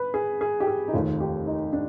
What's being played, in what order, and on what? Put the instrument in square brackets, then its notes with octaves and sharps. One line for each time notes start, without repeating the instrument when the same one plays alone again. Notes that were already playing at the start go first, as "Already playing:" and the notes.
Already playing: [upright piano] B4
G#4
G#4
G4
G#4
D#4
F1 D#2 D#3 F4
G4
D#4
D4